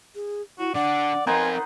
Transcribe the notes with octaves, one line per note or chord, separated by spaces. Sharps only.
G#4
E4 F#4
D3 D5 F#5
B3 C4 D#4 F4 A#4 C5 G#5